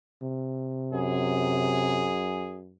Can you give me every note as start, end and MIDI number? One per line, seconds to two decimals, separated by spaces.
0.22 2.11 48
0.93 2.75 42
0.93 2.59 68